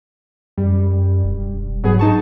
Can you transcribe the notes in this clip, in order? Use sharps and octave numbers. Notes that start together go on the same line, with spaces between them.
F#2 G3
E1
G#2 F#3 B3 G#4
D#4 A5 C#6